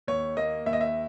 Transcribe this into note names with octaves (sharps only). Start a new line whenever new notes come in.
D#2 C#5
A#3 D#5
D#2 E5
D#5
E5